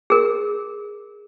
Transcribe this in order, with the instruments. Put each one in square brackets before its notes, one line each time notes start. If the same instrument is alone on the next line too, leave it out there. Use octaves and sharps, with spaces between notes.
[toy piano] G#4 A#4